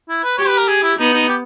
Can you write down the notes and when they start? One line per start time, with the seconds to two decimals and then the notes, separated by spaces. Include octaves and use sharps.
0.09 E4
0.24 B4
0.38 G4 C#5
0.48 B4
0.58 A#4
0.68 G#4
0.83 E4
0.99 B3 D#4
1.13 D#4
1.28 G4